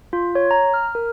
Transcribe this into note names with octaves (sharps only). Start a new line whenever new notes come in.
F4
C#5
A#5
F6
A#4